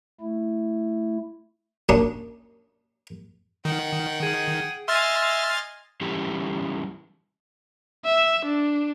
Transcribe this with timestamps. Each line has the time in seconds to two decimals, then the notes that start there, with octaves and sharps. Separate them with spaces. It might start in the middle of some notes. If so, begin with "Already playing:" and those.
0.21 A3 E4
1.89 F#2 A#3 C#4 D4 D#6
3.65 D#3 F#5 G5
4.23 G#4
4.88 D#5 E5 G#5 C6 F6 A6
6.01 E3 G3 C#4 E4 G4
8.05 E5
8.45 D4